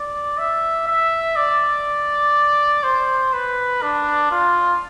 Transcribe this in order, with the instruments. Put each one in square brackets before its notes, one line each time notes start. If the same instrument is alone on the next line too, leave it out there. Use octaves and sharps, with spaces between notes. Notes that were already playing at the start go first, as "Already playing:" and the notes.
Already playing: [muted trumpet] D5
E5
E5
D5
C5
B4
D4
F4